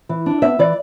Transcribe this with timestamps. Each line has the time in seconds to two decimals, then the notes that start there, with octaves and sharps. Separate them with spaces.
0.09 E3
0.26 D4
0.42 B3 E5
0.59 E3 D5